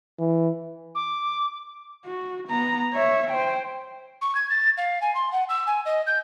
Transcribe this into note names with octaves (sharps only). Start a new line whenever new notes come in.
E3
D6
F#4
B3 A#5
C#5 E5
C5 G5
C#6
G#6
A6
F5
G#5
C6
F#5
E6
G#5
D#5
G6